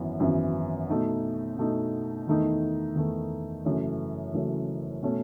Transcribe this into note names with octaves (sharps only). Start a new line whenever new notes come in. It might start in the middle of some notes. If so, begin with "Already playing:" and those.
Already playing: G#1 F#2 E3 B3
G#1 F#2 E3 B3 E4
B2 A3 D#4
B2 A3 D#4
E2 D#3 A3 D#4
E2 D#3 A3 D#4
F#1 F#2 E3 A3 C#4
F#1 F#2 E3 A3 C#4
B2 A3 C#4